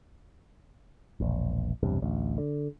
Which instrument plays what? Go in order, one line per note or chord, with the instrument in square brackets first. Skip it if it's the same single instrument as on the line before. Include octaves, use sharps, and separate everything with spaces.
[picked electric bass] E1 A#1
B1 E2 G2 C3
A1 D2
D3